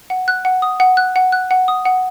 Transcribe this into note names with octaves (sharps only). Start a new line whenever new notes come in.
F#5
F#6
F#5
D#6
F#5
F#6
F#5
F#6
F#5
D#6
F#5